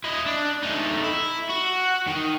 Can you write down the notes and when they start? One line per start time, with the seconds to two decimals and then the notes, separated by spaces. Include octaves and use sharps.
0.04 E4 D#5
0.26 D4
0.63 A3 D#4
1.03 E4
1.49 F#4
2.08 D#3